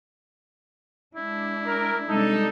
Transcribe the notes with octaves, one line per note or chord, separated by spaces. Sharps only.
G#3 D4 E4
A#4
C3 G3 G#3 D4 D#4 A4